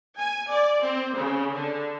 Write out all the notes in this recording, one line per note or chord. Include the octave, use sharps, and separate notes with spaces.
G#5
D5
C4
C#3
D3